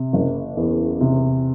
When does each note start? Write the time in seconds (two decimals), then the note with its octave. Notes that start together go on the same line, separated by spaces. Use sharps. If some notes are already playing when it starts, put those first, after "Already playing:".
Already playing: C3
0.13 F#1
0.57 E2
1.01 C3